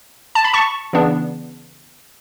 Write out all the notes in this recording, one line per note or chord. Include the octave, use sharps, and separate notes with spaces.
A5
B5
A5 C#6
C#3 E3 B3 D4